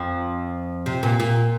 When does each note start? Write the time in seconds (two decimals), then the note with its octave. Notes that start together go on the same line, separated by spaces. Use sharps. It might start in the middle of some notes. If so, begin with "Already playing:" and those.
Already playing: F2 F3
0.86 C3
1.03 A#2
1.20 A#2